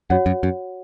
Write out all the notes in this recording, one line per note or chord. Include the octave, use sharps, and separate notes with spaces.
F#2 F#4 C#5 F#5
F#2
F#2